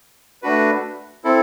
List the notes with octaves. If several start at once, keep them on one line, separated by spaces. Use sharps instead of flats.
A3 D4 F#4 B4
C4 E4 A4